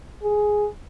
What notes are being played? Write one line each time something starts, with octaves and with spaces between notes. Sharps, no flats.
G#4